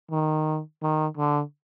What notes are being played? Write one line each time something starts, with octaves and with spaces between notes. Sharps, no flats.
D#3
D#3
D3